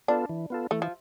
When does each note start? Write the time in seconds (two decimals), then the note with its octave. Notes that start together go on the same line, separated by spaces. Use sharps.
0.08 B3 D4 F4 A4
0.29 E3
0.50 B3 F4 A4
0.71 E3 A3
0.82 F3